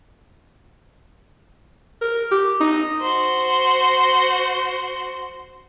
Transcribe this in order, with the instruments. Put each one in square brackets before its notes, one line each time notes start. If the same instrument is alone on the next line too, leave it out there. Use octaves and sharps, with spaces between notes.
[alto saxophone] A#4
G4
D#4
[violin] F#4 C5